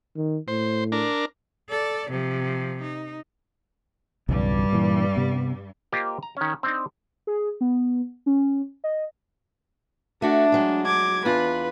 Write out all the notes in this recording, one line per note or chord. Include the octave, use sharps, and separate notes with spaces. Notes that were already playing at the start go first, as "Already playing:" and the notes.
D#3
A2 C5
D4 A#4
A4 D5
C3 F3
D#4
B1 E2 G2 C#3 G3
A#2 E3
C3 B3
A#3 F4 G4 A#4 C5 D#5
A#5
D#3 C#4
C4 D4 D#4
G#4
B3
C#4
D#5
A3 D4 F#4
F#3 G#3
D6 G#6
E2 D4 F4 B4